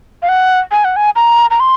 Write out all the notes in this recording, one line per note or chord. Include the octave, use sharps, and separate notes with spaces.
F5
F#5
G#5
F#5
G#5
A#5
A#5
C6